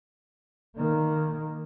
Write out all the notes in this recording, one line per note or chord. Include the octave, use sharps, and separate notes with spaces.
D#3 A#3